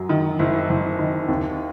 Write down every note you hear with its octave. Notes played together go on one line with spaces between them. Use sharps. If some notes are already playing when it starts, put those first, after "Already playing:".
Already playing: F#2 F#3
D#3
F#1 E4
F#1
D#3
D#2